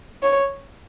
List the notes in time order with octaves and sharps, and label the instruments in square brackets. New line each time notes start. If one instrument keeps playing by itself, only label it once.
[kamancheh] C#5